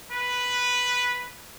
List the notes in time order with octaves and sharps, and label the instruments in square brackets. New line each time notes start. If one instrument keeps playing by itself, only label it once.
[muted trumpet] B4